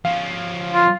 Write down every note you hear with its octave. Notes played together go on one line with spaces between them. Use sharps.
F3 C#4 F5
F4